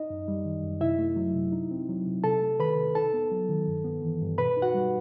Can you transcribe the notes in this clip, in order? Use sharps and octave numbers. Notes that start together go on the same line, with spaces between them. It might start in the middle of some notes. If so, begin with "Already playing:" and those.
Already playing: D#4 D#5
F#2
G3
D#3
F#2
C3 E4 E5
A3
F#3
C3
D#4
C4
F#3
C3
C3 A4 A5
A3
D#3 B4 B5
C3
D#4 A4 A5
B3
F#3
D#3
G2
B3
E3
G2
B2 B4 B5
D#4
F#4 F#5
G3